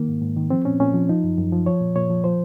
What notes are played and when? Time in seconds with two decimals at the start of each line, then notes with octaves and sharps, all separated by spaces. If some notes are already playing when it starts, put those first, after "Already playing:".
Already playing: D#3 A#3
0.08 G#2
0.22 G#2
0.37 D#3
0.50 F3 C4
0.65 A#2 C#4
0.80 A#2 C#4
0.94 F3
1.09 F3 D#4
1.24 F#2
1.37 F#2
1.52 F3
1.66 F3 C#5
1.81 A#2
1.96 A#2 C#5
2.10 F3
2.24 F3 C5